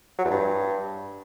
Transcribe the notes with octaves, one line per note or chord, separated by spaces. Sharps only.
F#3
E2
G2